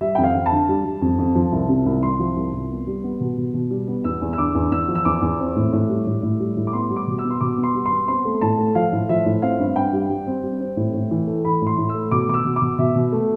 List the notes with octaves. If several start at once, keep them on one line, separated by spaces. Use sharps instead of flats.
G3 E5
F2 G5
F5
F2
A5
D3
G3
G3
F2
F2
F3
C2
C3
C2
C2 C6
F3
C2
C2
B3
G3
B3
B2
B2
B2
G3
B3
E2 E6
E2
E6
D3 D6
E2
E2 E6
F3
E6
E2 D6
E2
C4
A2
A2
G3
A2
A2
G3
A2
D6
B3 C6
G3
D6
B2
E6
B3
C6
B2 D6
B3
C6
G3
C6
B3
C4 C6
A3
A2 A5
A3
F3 F5
A2
F3 E5
A2
C4 F5
G2
G2 G5
G3
G3
C4
G3
C4
A2
A2
E3
A3
E3 B5
A2
C6
A2
E6
A3
B2 D6
B2 D6
E6
B2
D6
B2
B2 E5
B2
A3